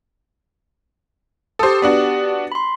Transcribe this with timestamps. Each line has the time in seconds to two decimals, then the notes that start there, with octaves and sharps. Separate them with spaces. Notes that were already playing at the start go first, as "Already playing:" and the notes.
1.59 G4 A4 C5 D#6
1.82 B3 D4 F#4
2.52 B5 C6